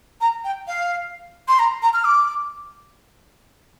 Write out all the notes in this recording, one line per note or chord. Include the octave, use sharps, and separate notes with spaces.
A#5
G5
F5
C6
A#5
A#5
F6
D6